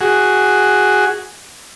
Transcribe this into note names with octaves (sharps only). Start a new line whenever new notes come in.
F#4 G#4